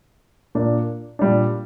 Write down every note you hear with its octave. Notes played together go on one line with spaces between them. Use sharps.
A#2 A#3 D4
A#2 G3 D4